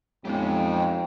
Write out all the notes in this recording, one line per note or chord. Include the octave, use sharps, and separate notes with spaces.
F2 G#3 B3 C#4 D#4 G4